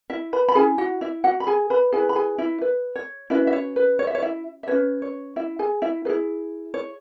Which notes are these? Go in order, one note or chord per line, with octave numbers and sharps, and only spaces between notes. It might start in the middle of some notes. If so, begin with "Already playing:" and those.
E4 E5
B4 B5
B5
C#4 E4 G#4 G#5
F#4 F#5
E4 E5
F#4 F#5
B5
G#4 G#5
B4 B5
E4 G#4 B4 G#5
B5
G#4 G#5
E4 E5
B4
C#5
C#4 E4 F#4 B4 E5
E5
C#5
B4
C#5
E5
C#5
E4 E5
E5
C#4 F#4 B4 C#5
C#5
E4 E5
G#4 G#5
E4 E5
E4 G#4 B4
C#5